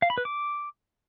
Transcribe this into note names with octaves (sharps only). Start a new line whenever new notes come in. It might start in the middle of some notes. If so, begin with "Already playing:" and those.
F5
B5
B4
D6